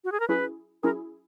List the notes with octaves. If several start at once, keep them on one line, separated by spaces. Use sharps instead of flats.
F#4
G#4
A#4
F#3 C#4 E4 G#4 B4
F#3 C#4 E4 G#4 A#4